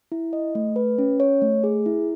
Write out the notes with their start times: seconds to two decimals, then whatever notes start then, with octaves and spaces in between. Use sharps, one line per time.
0.12 E4
0.33 D#5
0.55 A3
0.76 B4
0.98 C#4
1.20 C#5
1.42 A3
1.64 G#4
1.86 E4